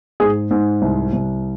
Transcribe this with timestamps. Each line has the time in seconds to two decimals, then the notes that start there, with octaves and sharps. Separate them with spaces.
0.20 G#2 G#4
0.51 G#2
0.82 C2
1.13 C2